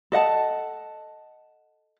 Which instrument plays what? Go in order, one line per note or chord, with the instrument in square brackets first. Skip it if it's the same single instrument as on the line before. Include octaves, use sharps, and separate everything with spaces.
[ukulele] A4 D#5 F#5 A5